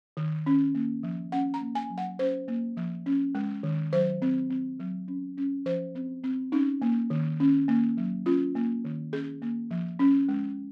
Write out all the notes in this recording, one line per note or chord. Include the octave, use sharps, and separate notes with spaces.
D#3
C#4
A#3
F3
C#4 F#5
A#5
A#3
G#5
F#3
F#5
C#4 C5
A#3
F3
C#4
G#3
D#3
F#3 C5
C4
C4
F#3
C#4
C#4
F3 C5
C4
C4
C#4 D#4
A#3
D#3
C#4
A#3
F#3
C#4 F4
A#3
D#3
C#4 G#4
A#3
F3
C#4
G#3